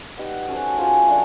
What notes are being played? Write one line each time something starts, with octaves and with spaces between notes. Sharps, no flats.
B3 D#4 G4
C#4 F#4 A4 C5
C#4 F4 G#4 C5
F#3 A3 D4